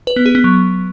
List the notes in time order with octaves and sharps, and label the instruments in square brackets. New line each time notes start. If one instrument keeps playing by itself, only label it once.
[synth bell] B4
B3
G#4
B3
F#3